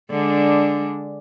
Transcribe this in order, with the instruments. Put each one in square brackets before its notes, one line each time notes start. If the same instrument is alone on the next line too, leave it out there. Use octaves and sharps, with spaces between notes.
[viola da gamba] D3 G#3 D4